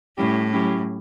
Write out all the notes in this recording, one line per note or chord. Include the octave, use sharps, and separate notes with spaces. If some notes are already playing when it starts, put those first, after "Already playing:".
A2 G3 C#4 E4 G4
F#3 C#4 E4 G4